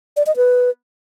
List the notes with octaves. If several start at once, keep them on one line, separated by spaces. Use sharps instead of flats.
D5
D#5
B4